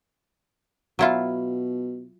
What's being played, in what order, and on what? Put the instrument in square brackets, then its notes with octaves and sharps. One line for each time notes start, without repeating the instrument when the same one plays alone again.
[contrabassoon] B2 [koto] F#3 E4 F4